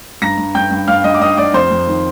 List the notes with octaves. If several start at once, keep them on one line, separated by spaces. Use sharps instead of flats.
G2 A#5 A#6
G2
G2 G5 G6
G2
G2 F5 F6
G2 D#5 D#6
D6
G2 D#5 D#6
G2 D5 D6
F2 C5 C6
F2
D#3